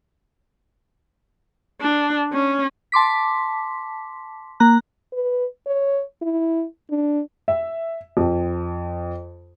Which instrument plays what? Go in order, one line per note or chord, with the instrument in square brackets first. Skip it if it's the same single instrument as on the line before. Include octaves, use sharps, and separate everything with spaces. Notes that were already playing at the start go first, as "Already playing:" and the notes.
[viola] D4
C#4
[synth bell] A5 C6 D6 B6
A#3 A#5 F#6
[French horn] B4
C#5
E4
D4
[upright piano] E5
F2